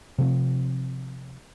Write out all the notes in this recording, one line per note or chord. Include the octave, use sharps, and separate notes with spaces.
C3 F3 C4